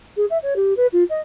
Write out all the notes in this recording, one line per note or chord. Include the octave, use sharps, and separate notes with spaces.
G#4
E5
C#5
G4
B4
F4
D#5